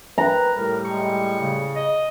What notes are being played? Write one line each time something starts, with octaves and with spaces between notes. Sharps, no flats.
B4 A#5
A2 G3 A#4
G#3 C#6
C#3
D#5